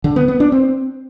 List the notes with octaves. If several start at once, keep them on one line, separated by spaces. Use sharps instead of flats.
D3
B3
B3
D4
C4